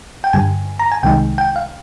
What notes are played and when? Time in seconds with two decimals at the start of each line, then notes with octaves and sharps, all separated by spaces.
0.24 G5
0.33 G2 D3 G3 G#5
0.79 A#5
0.92 G#5
1.03 C2 C3 D#3 G#3 D#4 G5
1.38 G5
1.56 F5